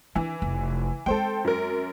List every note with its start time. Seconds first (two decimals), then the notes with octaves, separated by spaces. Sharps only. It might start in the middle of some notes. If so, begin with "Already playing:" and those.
0.15 D#3 E3 D4
0.42 F1
1.06 G#3 C4 A4 C5 G5
1.45 F#2 A#4